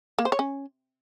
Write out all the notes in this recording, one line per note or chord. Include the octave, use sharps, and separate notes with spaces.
A#3
C5
C#5
C#4